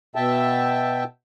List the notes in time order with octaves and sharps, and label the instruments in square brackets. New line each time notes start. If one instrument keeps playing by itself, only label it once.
[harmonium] B2 E5 G5 A5